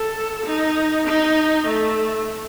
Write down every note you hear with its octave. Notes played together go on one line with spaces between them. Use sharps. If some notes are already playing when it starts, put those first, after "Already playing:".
Already playing: A4
D#4
D#4
A3